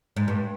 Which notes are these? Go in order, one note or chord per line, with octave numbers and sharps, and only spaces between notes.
G#2
G2